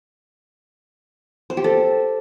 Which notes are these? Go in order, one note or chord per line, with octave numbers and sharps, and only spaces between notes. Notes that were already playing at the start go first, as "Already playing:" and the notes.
C5
G4
A4